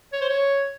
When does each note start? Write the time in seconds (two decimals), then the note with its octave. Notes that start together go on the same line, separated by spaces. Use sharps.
0.13 C#5
0.21 C5
0.29 C#5